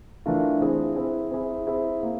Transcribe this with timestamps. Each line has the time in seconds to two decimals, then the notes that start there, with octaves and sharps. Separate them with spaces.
0.26 E3 A3 D4 F4 A#4
0.61 C4 E4 G#4
0.96 C4 E4 G#4
1.32 C4 E4 G#4
1.67 C4 E4 G#4
2.03 A#3